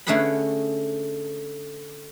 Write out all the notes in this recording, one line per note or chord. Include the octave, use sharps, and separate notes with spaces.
D3 A3 C#4 G#4 F#5 B5